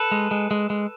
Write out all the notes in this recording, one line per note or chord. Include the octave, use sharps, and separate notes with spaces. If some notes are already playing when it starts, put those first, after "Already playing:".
Already playing: A4 B4
G#3
G#3
G#3
G#3